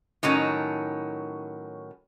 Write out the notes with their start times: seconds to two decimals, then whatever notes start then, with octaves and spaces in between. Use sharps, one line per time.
0.23 A2 D#3 F#3 C#4